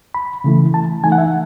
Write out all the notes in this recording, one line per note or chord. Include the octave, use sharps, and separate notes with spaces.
B5
C#3 E3 A3 E4
A5
E3 A3 D#4 G#5
F#5
E5